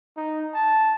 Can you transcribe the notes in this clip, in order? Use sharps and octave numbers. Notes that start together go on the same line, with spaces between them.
D#4
A5